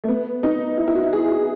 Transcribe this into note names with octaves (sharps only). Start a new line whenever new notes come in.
A3
B3
D#4
E4
E4
F#4
G#4
F#4